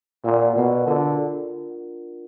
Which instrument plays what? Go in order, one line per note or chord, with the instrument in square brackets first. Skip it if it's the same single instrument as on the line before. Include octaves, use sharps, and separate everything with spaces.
[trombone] A#2 [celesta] A#4 D5 F#5
[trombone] B2 [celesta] A#4 D5 F#5
[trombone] D3 [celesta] D4 F4 A#4